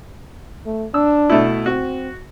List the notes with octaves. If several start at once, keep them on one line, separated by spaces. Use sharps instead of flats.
A3
D4 E6
B2 A3 E4
C4 F#4